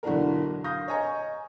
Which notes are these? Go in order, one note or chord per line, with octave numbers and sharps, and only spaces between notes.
B1 D3 E3 D4 A#4
F5 D#6 F6 G6 A#6
C#5 D#5 G#5 A#5 C#6